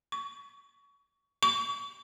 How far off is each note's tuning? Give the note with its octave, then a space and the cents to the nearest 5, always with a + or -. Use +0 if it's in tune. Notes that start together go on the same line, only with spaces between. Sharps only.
C#6 +25
C#6 +40